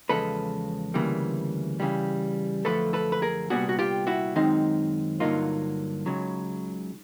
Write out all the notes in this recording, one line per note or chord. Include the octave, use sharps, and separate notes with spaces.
E2 C#3 F3 G#3 A4 B4
D2 C#3 E3 G3 A#3
C#3 E3 G3
F#2 D3 F3 A3 A4 B4
A4 B4
B4
G#4 A#4
C2 A#2 G3 B3 D4 F#4 G#4
F#4
F4 G4
E4 F#4
F#2 D#3 G#3 C4 D#4
G2 D3 F#3 A#3 D#4 F4
C#2 C#3 F#3